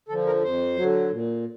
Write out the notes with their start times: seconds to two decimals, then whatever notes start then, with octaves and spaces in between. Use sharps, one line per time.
0.09 D3 F3 A4
0.26 A#4
0.42 F2 C5
0.76 F#3
0.81 D3
1.11 A#2